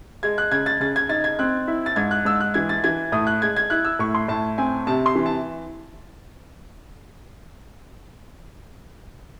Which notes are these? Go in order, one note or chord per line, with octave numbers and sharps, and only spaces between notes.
G#3 G#6
F#6
C#3 G#6
A6
C#3 A6
G#6
D#4 A6
G#6
C4 F#6
E4
A6
G#2 G#6
F#6
G#2 E6
F#6
E3 G#6
A6
E3 G#6
A2 D#6
F#6
G#3 G#6
G#6
E4 F#6
E6
A2 C#6
C6
A2 A5
C4 G#5
C3 A5
C6
E3
A5